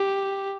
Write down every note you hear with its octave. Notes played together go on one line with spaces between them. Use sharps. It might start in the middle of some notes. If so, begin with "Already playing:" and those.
Already playing: G4